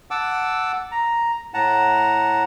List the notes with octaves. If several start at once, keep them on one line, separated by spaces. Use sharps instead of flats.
F#5 A5 D6 E6
A#5
A2 F#5 A5 A#5